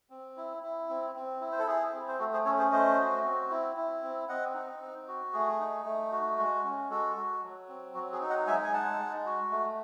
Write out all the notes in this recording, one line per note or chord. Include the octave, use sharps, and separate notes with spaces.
C4
E4
E4
C4
C4
E4
C5
A4
E4 G#4
C4
C5
A3 F#4 A4
G#4 C5
C#4 A4 C#5
G#4 C5
A3 C5 D#5
F#4
C4
E4
E4
C4
C4 D#5 F#5
D#4
C4
F#4
A3 G#4
D#4
A3
F#4
G#3
C#4
G#3 F#4 A4
F#4
F#3
C4
F#3 F#4
G#4
D#4
D#5 F#5
G#3 E5 G#5
G#5
D#4 F#5 A5
G#3
F#4
A3